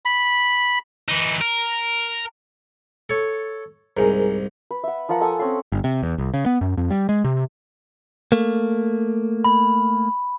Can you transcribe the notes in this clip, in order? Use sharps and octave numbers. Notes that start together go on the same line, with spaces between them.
B5
E3 D#4
A#4
A4 C#5
C2 G#2 G#4 A#4
B4
E5 F#5
F3 F4 A#4 F#5
A4 F#5 G#5 D#6
C4 C#4 A4 C6
G1
C3
E2
C2
C#3
B3
F#2
F2
G3
G#3
C3
A3 A#3
B5